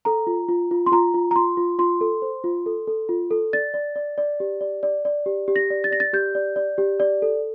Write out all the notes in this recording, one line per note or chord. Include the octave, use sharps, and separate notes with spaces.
A4 A#5
F4
F4
F4
C6
F4 A#5
F4
A#5
F4 C6
F4
F4 C6
A4
C5
F4
A4
A4
F4
A4
D5 A6
D5
D5
D5
G4
D5
D5
D5
G4
G4
A#6
D5
A6
D5 A#6
A6
G4 G6
D5
D5
G4
D5
A4